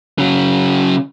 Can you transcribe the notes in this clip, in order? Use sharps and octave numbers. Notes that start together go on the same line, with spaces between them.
C#3 F#3